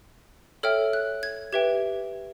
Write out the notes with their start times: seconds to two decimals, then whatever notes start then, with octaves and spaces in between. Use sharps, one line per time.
0.63 A4 C#5 E5 G5 F6
0.93 F#6
1.23 G#6
1.53 G4 B4 E5 G5 G#6